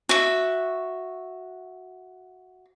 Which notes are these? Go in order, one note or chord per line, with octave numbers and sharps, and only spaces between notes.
F#4 E5